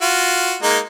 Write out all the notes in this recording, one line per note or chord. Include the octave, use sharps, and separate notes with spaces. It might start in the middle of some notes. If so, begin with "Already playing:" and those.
F4 F#4
G#3 A#3 D#4